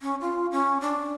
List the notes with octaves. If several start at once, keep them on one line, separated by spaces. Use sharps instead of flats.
C#4
F4
C#4
D4